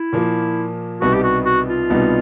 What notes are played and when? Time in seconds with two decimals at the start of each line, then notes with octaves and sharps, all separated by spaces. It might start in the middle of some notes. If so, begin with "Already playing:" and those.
Already playing: E4
0.13 A#2 F3 A#3
1.01 C2 B2 G3 B3 D#4 F#4
1.14 G4
1.23 F#4
1.45 F#4
1.68 F4
1.90 C2 B2 G3 B3 D#4